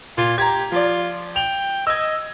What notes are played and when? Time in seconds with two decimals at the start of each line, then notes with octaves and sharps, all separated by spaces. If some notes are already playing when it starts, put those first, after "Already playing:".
0.18 A#2 F4
0.38 G4 A#5 G#6
0.72 F3 F4 D5
1.36 G5 F7
1.87 D#5 E6 G#6